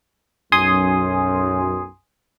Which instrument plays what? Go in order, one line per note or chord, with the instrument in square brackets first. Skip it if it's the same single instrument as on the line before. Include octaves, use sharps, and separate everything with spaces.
[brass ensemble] B1 F#2 [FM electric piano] G#5 C6 D#6